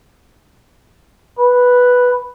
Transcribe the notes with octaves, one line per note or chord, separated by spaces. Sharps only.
B4